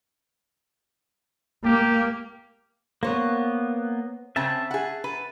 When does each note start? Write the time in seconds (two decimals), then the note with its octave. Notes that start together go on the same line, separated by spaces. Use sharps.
1.65 A#3 G4
3.03 A#3 B3 C5 C#5
4.36 C#3 C4 E5 A5
4.71 G#4 F#5
5.04 B4